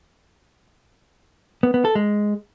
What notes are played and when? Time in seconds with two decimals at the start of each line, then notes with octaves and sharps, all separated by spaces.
1.63 B3
1.74 B3
1.85 A4
1.95 G#3